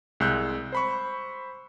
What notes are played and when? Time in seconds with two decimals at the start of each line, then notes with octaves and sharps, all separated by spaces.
0.20 C2 G#3 E6 F#6 G6
0.72 C5 B5 C#6